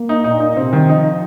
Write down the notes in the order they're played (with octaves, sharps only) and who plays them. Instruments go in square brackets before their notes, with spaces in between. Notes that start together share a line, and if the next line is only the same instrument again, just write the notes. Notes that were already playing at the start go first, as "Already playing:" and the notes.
Already playing: [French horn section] A#3
[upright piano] D#4
[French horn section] A#2 [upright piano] D#4
[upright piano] D#4
[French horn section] C3 [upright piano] C4
[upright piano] D#3
[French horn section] F3 [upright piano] D#4